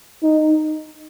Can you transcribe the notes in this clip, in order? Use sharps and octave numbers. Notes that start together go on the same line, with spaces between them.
D#4